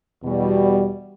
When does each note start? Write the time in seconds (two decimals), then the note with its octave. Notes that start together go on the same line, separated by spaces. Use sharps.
0.23 E2 B2 G3